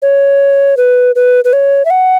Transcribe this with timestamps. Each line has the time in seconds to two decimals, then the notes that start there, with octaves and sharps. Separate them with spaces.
0.02 C#5
0.77 B4
1.16 B4
1.45 B4
1.53 C#5
1.85 E5
1.90 F#5